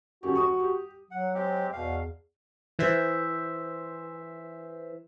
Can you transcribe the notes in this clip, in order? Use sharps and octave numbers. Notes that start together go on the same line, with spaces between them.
D#1 F#2 F#4 G4
C#6 D#6
G4
F#3 F#5
G#3 C4 G4
E2 B2 F5
E3 C5 E5